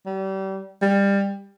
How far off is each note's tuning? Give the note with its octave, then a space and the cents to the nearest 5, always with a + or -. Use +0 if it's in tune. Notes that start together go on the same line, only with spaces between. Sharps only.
G3 -30
G3 +20